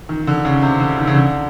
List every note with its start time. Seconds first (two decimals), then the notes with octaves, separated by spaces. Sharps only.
0.09 D#3
0.27 D3
0.45 C#3
0.62 C3
0.80 D3
0.98 D#3
1.07 C#3
1.15 D3